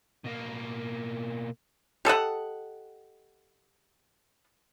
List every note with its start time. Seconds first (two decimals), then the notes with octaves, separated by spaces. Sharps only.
0.25 B2 A#3
2.05 G4 A4 D#5 F#5